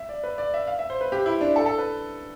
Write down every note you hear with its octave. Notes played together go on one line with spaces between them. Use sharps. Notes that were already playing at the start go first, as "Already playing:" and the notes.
Already playing: E5
D5
B4
D5
E5
F5
E5
C5
B4
G4
E4
D4
A4
A4
B4